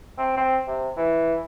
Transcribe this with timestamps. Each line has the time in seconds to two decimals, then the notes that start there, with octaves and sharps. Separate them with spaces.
0.18 C4
0.37 C4
0.67 C3
0.97 E3